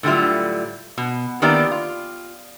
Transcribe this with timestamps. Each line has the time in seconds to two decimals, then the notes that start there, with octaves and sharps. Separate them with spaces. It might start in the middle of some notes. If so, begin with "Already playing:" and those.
0.03 A2 D3 F#3 G3 F4 E5
0.98 B2
1.42 D#3 A#3 B3 E4 G4 D5
1.71 F4